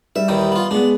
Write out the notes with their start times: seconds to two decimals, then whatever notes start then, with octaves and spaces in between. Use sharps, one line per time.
0.16 G3 E5
0.28 D#2 D#3 E3
0.52 B3 F4
0.71 G#3 B3 D4